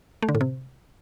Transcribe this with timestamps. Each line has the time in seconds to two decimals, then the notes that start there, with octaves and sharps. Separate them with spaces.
0.22 A3
0.29 D3
0.35 A2
0.41 C3